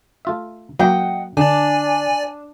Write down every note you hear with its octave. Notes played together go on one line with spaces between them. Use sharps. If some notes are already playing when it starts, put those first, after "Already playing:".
A3 F4 E5
F#3 A#3 D#5 F#5 G5
D3 D4 D5 G#5